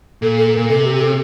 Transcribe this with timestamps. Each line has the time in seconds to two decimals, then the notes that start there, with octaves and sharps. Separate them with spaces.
0.22 A#2 A4
0.38 A4
0.54 A#4
0.57 A#2
0.69 C3 A4
0.85 G4
0.95 G4
1.01 A4